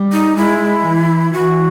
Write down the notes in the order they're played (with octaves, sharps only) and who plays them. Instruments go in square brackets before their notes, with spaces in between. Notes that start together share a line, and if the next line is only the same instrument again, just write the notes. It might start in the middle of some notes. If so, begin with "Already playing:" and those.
Already playing: [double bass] G3
[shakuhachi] D#4
[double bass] G#3 [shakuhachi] E4
[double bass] E3
[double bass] E3 [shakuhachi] F#4